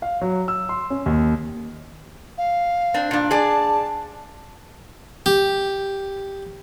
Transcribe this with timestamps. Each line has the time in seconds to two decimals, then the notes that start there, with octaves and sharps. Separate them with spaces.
0.02 F5
0.21 F#3
0.48 E6
0.69 C6
0.90 C#4
1.06 D#2
2.38 F5
2.94 C4 D4
3.11 A#2 D4
3.31 G#4 D5 A5
5.26 G4